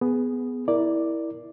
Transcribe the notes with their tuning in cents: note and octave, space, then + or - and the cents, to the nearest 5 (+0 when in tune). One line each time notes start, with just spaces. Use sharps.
B3 +10 G#4 +0
E4 -10 A#4 +10 D5 +0